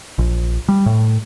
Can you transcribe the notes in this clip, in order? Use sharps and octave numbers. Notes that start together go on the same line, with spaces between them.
A#1
G3
A2